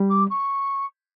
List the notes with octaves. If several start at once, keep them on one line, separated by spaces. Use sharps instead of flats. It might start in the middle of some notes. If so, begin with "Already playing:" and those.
Already playing: G3
D6
C#6